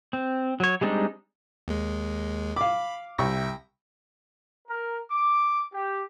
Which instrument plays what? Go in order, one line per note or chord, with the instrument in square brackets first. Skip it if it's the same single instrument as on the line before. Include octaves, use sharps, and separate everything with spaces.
[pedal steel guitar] C4
F#3 C#5
G3 G#3 C4 D4 D#4
[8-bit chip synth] D#2 G#3
[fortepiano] F5 D6 [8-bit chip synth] B5
[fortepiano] C2 C#6 [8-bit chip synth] E5 G5 A#6
[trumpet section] A#4
D6
G4